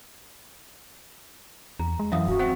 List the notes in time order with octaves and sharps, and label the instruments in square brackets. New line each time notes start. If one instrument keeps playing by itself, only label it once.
[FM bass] E2 [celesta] A#5
[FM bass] G#3
[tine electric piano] F#2 [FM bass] E3 [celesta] E5 F5 D#6
[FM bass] D#1 [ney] F#4
[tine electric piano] C4 [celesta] F#5